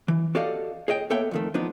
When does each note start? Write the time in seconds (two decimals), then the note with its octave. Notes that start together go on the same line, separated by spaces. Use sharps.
0.08 E3
0.35 F#4 G4 A4 D5 D#5 F5
0.88 G#4 C#5 D#5 G5
1.10 A#3 B3 A4 C#5 E5 G5
1.31 F2 D#3 A3
1.54 F3 B3 D4 D#4